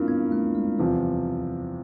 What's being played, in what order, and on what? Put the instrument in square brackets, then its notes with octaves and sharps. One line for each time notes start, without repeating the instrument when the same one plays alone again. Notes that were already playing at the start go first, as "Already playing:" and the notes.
Already playing: [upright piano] G2 A#3 [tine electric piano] C4 D4 E4 F4 A#4
[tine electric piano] B3
A3
G#3
[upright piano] E2 C3 F3 [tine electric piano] G3